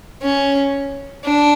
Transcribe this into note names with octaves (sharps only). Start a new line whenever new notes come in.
C#4
D4